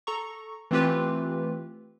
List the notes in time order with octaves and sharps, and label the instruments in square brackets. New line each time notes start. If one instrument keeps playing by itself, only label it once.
[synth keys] A4 A#5 C#6
E3 A3 C4 F4 G4 B4